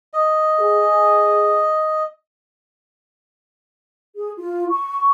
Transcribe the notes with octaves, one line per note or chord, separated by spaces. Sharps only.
D#5
G#4
G#4
F4
C#6